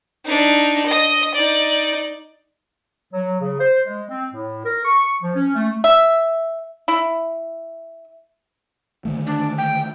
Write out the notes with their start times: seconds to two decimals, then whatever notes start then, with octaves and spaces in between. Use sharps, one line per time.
0.25 D4 D#4
0.86 D#5 D#6
1.34 D#4 D5
3.13 F#3
3.41 C#3
3.60 C5
3.86 G#3
4.10 C4
4.32 A2
4.65 A#4
4.85 C#6
5.22 F3
5.35 C#4
5.56 A3
5.84 E5
6.88 E4
9.05 D3 D#3 A3
9.26 D4
9.58 G5